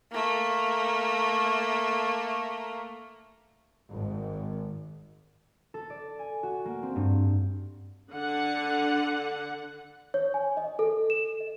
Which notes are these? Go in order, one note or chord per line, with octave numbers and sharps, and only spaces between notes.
A3 A#3
G#1
A4
D5
G#5
F#4
A#3
C4
G2
D3 F#5
C#5
G#5
D#5
A4
E7
D#5